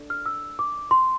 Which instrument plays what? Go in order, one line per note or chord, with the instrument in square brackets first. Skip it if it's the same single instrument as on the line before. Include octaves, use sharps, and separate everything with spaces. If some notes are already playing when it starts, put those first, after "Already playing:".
Already playing: [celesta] D4 A4 D5
F6
E6
D6
C6